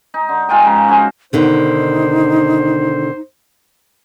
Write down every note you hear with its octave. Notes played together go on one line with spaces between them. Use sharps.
D#4
D3
G#2 F4 G5 G#5
C#3 F3 A#5
C#4 F#4 G#4 C5
B2 D3 D#3 D#4 C5